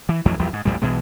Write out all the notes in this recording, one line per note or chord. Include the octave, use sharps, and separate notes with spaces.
E3
A1 F2 E3 F#3
A#1 E2 G3
G#2
A1 E2 A#2 G3
B1 B2 E3 G#3